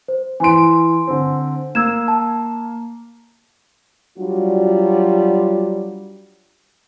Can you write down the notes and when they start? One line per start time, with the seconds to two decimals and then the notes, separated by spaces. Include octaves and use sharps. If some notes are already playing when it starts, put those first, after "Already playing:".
0.08 C5
0.40 E3 G#5 C6 D7
1.07 D3 C4
1.75 A#3 E6 G#6 E7
2.08 A5
4.18 F#3 G3 D4 F4 F#4